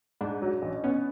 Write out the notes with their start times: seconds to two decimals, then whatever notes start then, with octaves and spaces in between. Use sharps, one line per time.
0.21 G#2 D4
0.42 F#3
0.62 A1
0.84 B3 C#4